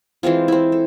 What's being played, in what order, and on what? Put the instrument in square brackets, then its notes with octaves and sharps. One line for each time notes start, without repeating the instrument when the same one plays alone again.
[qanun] E3 G#3 C4 F4
C4 E4
A4